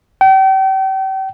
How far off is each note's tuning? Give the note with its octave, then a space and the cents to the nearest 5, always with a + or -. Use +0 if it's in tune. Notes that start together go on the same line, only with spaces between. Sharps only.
G5 -35